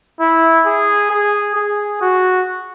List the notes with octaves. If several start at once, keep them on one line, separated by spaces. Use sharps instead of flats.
E4
G#4
G#4
G#4
F#4